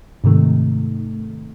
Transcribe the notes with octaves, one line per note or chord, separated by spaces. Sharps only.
G#2 C3 D#3 A3